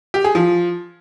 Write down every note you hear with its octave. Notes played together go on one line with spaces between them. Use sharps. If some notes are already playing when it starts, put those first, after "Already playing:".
G4
G#4
F3